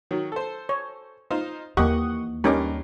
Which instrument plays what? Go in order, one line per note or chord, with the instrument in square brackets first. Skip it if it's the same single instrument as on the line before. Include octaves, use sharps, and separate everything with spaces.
[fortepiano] D#3 F#3
A4 C5
[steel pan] C#5
[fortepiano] D#4 F4 C5
[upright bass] D#2 E3 [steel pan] A#3 G4 [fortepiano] D#5 F#5 C#6
[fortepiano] G2 A#4 D6 [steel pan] C#4 D#4 G4